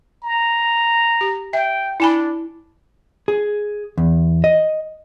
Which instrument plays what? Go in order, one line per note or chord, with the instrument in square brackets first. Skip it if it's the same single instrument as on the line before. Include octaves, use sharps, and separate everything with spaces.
[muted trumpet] A#5
[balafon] G4
[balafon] E5 [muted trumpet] G5
[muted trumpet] D4 [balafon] E4 G#5 B5
[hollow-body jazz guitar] G#4
E2
D#5